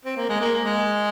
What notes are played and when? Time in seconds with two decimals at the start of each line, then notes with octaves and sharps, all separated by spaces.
0.05 C4
0.16 A#3
0.29 G#3
0.40 A#3
0.64 G#3